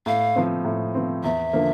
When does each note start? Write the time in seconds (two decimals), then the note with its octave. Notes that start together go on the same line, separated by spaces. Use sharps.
0.06 A2 F5
0.35 F3 C4
0.65 A2
0.94 F3 C4
1.23 E2 E5
1.53 D3 F3 A#3